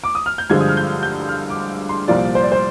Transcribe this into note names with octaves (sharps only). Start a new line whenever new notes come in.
D6
D#6
F6
G6
G2 D3 F3 G#3 G#6
D#6
F6
G6
G6
F6
D6
C6
C2 A#2 F3 A#3 D5
C5
D5
C5